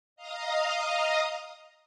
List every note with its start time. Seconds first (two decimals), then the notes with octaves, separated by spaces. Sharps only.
0.16 D#5 F5 A#5 D#6